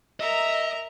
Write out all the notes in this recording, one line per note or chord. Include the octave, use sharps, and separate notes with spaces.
A#4 D#5 E5 A#5